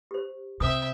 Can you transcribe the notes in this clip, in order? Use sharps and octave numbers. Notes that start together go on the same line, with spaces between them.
G4 C5
C3 C4 E5 D#6